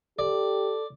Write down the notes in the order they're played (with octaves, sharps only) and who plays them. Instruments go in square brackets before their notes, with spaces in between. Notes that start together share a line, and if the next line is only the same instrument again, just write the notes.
[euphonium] G4 [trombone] A4 [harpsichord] D5